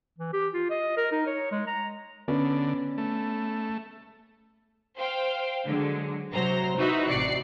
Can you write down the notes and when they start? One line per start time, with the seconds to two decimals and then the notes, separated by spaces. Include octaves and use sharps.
0.18 E3
0.33 G4
0.54 F4
0.70 D#5
0.97 A#4
1.12 D#4
1.27 C#5
1.52 G#3
1.67 A#5
2.28 D3 B3 C#4
2.98 A3
4.97 C5 F5 G5
5.66 D3 F#3 G#3
6.32 C3 F#3 C5 A#5 A#6
6.76 D#4 E4 F#4 B4 C5 E5
7.06 A1 C3 D5 C7 C#7